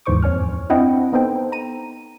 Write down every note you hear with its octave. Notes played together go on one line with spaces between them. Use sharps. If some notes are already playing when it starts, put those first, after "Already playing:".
D#2 G#2 E3 C5 C#6 D6
F2 C#5 G#5 F6
C4 D4 E4 D#5 F#5 G5
B3 D#4 A4 C5 G5
A#5 D#7